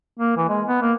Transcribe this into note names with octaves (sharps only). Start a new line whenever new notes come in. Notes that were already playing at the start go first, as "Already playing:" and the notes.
A#3
E3
G#3
B3
A#3